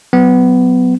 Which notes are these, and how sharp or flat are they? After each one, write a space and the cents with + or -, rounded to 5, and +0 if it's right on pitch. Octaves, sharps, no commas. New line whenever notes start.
F#3 +0 B3 +20